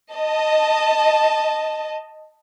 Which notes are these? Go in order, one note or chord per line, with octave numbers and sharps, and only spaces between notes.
D#5 A5